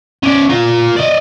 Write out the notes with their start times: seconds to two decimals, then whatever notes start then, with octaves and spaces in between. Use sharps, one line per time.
0.23 C#4 D5
0.49 F4 A#4
0.96 D5 D#5